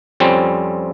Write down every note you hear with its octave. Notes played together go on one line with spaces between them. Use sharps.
F2 G3 C4 C#4